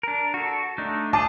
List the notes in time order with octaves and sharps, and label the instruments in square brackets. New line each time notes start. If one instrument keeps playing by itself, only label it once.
[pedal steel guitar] D4 A#4
F#4 A4
A3 D4 D#4
[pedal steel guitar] F4 G#4 D#5 [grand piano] A5 D6